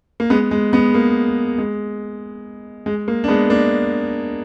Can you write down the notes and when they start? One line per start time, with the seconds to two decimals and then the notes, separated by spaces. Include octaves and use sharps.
0.20 A#3
0.30 G#3 B3
0.51 G#3
0.73 G#3 B3
0.94 A#3
1.58 G#3
2.86 G#3
3.08 A#3
3.24 D4
3.28 G#3 B3
3.50 A#3 D4